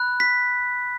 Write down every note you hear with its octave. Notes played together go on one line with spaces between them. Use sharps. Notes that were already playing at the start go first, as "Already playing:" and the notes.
Already playing: B5 F#6
B6